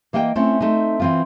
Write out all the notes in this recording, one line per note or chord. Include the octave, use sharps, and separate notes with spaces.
E3 A#3 D#5 E5 G5
A3 C4 C#4 E4
A3 C4 D#4
E3 C4 F4